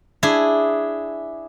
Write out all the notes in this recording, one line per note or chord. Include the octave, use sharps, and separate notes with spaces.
D4 E4 G#4